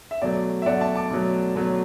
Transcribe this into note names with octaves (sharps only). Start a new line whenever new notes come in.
E5
B2 F#3 A3 D5
E5
B2 F#3 A3 D5 F#5
E5 A5
A5 D6
B2 F#3 A3
B2 F#3 A3